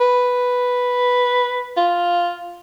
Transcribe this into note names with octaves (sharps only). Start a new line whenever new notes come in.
B4
F4